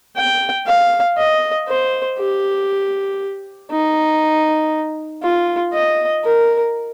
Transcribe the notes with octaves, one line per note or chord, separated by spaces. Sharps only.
G5
F5
D#5
C5
G4
D#4
F4
D#5
A#4